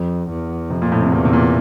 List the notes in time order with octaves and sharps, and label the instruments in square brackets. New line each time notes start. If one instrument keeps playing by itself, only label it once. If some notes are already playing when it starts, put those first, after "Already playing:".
Already playing: [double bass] F2
E2
[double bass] F2 [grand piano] C3
[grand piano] A#2
A2
C3
[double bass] E2 [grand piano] A#2
[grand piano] C3
A#2